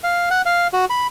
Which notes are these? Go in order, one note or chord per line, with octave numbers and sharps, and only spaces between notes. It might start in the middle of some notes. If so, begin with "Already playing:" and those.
F5
F#5
F5
F#4
B5